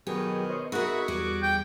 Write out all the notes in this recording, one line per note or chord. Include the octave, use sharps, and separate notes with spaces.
B2 D#3 F#3 B3 G4 G#4
C5 C#5 D#5
D#4 F#4 G#4 A#4 E5 B5
E2 G3 G#4 D6
G5